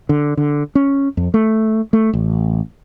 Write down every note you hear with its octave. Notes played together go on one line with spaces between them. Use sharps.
D3
D3
C#4
F2
A3
A3
A1